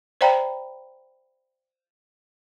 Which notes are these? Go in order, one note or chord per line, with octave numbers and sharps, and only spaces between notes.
C5 D5 F5 G5 A#5 B5